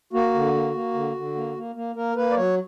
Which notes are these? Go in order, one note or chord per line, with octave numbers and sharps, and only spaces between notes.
A#3 F#4
D3
A#3
A#3
D3
D3
A#3
A#3
A#3
A#3 A#4
A#3 B4
D5
F#3 C#5